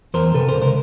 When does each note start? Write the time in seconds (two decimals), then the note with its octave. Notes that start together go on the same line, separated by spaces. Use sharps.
0.14 E2 A#4 C5
0.34 C3 A4 B4
0.48 A#4 C5
0.55 C#2
0.62 A#4 C5